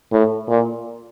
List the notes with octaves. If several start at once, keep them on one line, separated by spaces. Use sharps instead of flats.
A2
A#2